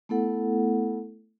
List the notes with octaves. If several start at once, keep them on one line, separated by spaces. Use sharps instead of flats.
A3 B3 E4 A4 F#5